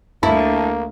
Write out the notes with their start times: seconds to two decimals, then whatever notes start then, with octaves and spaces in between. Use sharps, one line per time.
0.23 D2 D3 A#3 E4 A5